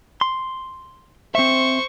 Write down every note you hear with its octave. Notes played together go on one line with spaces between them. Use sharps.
C6
C4 C5 E5 C#6